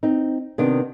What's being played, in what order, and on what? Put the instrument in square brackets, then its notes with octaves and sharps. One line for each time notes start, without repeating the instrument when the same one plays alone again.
[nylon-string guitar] C4 D#4
C3 D#3 B3 D4